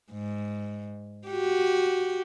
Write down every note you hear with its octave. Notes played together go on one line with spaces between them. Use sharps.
G#2
F#4 G4